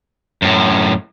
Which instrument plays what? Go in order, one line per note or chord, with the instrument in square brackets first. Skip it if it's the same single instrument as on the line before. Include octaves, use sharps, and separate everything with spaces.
[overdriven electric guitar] F#2 A2